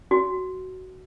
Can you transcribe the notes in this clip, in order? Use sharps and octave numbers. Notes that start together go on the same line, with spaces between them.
F#4